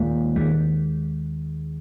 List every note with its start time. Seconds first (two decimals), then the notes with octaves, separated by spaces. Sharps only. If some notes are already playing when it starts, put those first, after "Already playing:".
Already playing: D#2 A#2 D#3 G#3
0.36 D#2 D#3 G#3